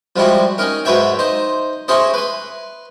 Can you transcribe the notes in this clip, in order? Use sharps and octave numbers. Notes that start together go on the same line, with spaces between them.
F3 G3 G#3 E4 F#4
C#4 D#4 A#4
G#2 F#3 B4 C#5 E5 G5
D#4 C5
C#4 E4 G#4 C5 D#5
B4 C6